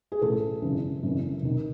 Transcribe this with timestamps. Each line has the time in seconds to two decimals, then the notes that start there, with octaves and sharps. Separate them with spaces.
0.12 G#4
0.22 A1 A2 E3 A4
0.62 G#1 F#2 C#3 E3
1.03 G#1 F#2 C#3 E3
1.42 D#2 D#3